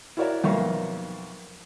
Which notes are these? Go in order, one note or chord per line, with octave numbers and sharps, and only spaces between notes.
E4 F#4 A#4 C#5 D5 E5
B1 F2 A#3 E5 F5 C#6